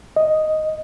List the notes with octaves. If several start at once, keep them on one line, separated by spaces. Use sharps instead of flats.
D#5